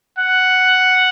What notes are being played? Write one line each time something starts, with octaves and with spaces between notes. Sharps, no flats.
F#5